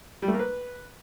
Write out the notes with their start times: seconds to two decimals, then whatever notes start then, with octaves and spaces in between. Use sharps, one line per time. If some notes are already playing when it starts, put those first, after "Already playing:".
0.22 G3
0.28 A3
0.34 A#3
0.39 B4